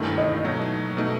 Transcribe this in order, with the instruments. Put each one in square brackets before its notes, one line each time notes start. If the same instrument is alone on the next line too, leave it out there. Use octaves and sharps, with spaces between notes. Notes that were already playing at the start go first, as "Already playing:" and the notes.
Already playing: [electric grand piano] G2 D#3 A3 E4
[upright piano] D#5
[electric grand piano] B2 F#3 A3 D#4
B2 A3 D#4